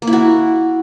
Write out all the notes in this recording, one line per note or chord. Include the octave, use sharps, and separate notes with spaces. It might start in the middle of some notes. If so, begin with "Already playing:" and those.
A#3
E4
F#4